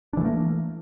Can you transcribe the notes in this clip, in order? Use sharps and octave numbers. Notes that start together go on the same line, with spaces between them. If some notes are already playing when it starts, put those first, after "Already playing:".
E3 A3 A#3 D4